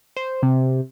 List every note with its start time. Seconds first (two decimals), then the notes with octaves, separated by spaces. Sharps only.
0.17 C5
0.43 C3